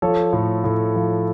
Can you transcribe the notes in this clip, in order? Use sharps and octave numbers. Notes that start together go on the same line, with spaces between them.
F3 A4 C#5
A2
A2
F3